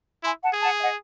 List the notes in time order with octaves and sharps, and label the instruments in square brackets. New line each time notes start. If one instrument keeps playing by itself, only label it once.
[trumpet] E4 [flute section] G#5 C6
[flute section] F#5 A5
[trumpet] G#4
[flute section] F#5 A5
E5
D#5 F#5